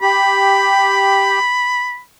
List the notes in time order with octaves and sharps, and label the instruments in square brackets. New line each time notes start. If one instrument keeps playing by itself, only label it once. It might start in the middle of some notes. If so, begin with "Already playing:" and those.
[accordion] G4 [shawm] B5